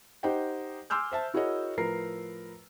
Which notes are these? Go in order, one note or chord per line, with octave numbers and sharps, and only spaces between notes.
D#4 G4 C5 D#5 F#5 G5
G#5 C6 D6 E6 F6 G6
C5 E5 A5
E4 F#4 G#4 A#4 C#5 D#5
A2 F3 A#4 B4 A#5 C7